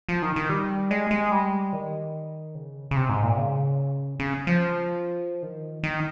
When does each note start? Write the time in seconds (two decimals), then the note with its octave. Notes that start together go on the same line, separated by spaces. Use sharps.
0.09 F3
0.22 D#3
0.36 D#3
0.49 G3
0.91 G#3
1.11 G#3
1.32 G3
1.73 D#3
2.55 C#3
2.91 C#3
2.96 C3
3.09 G#2
3.23 A#2
3.37 C#3
4.19 C#3
4.47 F3
5.43 D#3
5.83 D#3